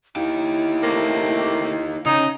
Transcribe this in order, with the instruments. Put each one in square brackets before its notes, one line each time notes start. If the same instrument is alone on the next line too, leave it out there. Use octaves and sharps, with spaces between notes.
[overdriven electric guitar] D#4 G4 [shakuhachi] E4
[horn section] C3 A3 A#3
[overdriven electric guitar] C#3 [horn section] D#4